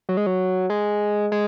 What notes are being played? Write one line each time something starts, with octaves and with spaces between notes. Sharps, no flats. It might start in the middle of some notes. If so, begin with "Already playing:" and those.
F#3
G#3
F#3
G#3
G#3